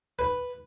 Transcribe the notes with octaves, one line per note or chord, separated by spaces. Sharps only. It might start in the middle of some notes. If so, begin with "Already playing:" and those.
B4